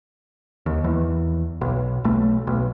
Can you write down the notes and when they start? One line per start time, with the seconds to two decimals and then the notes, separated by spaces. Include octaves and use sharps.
0.66 D#2
0.84 E2
1.61 B1
2.04 B1 A3
2.47 B1